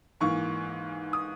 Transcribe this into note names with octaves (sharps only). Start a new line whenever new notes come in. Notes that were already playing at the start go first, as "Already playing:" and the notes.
G#2 E3 A#3 C#6
D#6